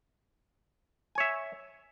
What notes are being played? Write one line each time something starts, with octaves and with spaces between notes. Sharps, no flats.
C#5 E5 G#5